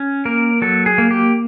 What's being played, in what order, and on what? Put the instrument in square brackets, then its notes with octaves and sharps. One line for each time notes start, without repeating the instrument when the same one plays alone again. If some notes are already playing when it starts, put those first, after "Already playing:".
Already playing: [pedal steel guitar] C#4
A#3 A#4
F#3 A4
G#4
A#3
G4